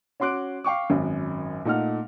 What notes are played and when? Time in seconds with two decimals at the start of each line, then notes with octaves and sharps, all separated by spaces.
0.20 C#4 F#4 C6 D6 F#6 D7
0.64 F5 G5 C#6 D6
0.90 G#1 F#2
1.65 A#2 A3 D#4 D#5 F#5 F6